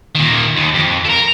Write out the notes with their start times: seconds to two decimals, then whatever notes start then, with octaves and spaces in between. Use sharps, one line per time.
0.15 A#2 D#3
0.56 D#2
0.74 F2
1.05 A4 A#4